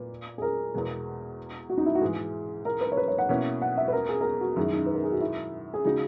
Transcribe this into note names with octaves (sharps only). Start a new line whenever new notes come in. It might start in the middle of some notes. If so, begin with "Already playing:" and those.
Already playing: A#2 A#3 B4
G#4
A#4
E2 B2 G#3
F#4
D#4
E4
F#4
G#2 E3 G#3 G#4
A#4
B4
C#5
B4
C#5
F#5
B2 A#3 C#4 E4
F#5
E5
B4
A#4
G#4
A#4
G#4
F#4
F#2 D#3 G#3 E4
D#4
B4
A#4
G#4
F#4
E4
G#4
C#3 G#3 D#4 F#4